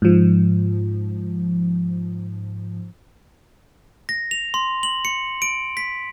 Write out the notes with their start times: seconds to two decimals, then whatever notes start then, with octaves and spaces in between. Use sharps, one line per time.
0.02 G#2 F3
4.09 A#6
4.31 F7
4.54 C6
4.83 F#7
5.05 C#7
5.42 D7
5.77 B6